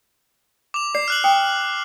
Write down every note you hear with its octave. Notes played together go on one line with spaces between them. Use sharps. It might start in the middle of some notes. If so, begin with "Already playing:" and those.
D6 F7
D5 C7
F6 F#6 F#7
G5 D#6